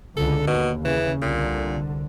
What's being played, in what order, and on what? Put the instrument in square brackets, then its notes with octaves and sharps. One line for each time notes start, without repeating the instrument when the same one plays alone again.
[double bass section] C#2 D3 [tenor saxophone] A4
[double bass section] D#2 [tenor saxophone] B2
[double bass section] C#3 [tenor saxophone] E3
[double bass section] C2 D3 [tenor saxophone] A#2